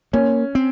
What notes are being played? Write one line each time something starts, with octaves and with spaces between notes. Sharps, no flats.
A#3 C#4
C4